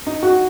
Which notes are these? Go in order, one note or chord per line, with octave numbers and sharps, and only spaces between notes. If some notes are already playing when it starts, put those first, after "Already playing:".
D#4
F#4